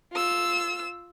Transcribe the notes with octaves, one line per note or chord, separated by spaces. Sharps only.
F4 E6